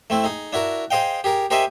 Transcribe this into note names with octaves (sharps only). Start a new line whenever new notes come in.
A3 C4 E4
D#4 G#4
D4 E4 F#4 A#4
G#4 C5 D#5 F5 G5
G4 G#4 A#4
G4 A#4 C5 D#5 E5 G#5